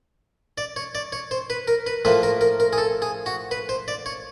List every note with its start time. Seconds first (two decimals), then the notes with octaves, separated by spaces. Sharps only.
0.58 D5
0.76 C#5
0.95 D5
1.12 C#5
1.31 C5
1.50 B4
1.68 A#4
1.87 B4
2.05 A2 F3 A#3 B4
2.23 A#4
2.41 A#4
2.60 A#4
2.73 G#4
2.78 A4
3.02 G#4
3.26 F#4
3.51 B4
3.69 C5
3.88 D5
4.06 C#5